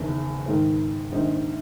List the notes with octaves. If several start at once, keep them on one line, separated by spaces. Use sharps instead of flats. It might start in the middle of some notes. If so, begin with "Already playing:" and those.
Already playing: F#1 E2 D#3
G#2 D#3 G#3
A#1 G#2 D#3 G#3 D#4